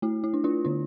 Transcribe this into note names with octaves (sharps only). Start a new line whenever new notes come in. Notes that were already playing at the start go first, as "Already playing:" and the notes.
A3 E4
E4
D4
D4 F4
D3 D4